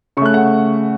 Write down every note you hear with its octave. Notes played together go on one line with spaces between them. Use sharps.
C#3 A3 C#6 F#6
F#5